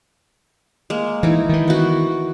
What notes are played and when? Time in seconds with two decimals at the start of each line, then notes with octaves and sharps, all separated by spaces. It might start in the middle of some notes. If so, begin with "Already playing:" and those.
0.90 G#3 A#3
1.23 E3 D#4 E4
1.49 D#3 E3
1.68 B3 F#4